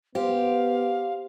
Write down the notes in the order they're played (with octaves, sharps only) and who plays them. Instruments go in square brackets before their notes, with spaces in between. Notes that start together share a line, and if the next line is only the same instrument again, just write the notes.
[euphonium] B3 [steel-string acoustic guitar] G4 [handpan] C5 [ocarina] F5